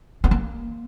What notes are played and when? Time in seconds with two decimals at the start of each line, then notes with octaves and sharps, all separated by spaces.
0.24 B3
0.31 A#3